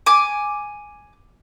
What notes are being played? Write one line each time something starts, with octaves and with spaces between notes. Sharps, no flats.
G#5 D6